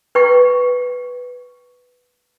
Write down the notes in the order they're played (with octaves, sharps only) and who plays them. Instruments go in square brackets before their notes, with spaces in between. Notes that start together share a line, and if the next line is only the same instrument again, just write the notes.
[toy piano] B4 G5 C#6